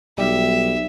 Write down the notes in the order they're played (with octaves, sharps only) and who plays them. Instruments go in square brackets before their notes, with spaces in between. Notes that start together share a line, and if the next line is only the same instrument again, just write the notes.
[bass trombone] B1 [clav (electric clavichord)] G3 [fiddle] E5